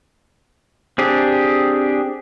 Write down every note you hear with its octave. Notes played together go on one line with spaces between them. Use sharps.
C4 D4 G4 G#4